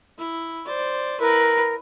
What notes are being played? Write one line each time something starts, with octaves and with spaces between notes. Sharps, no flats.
E4
C5 D5
E4 A#4 B4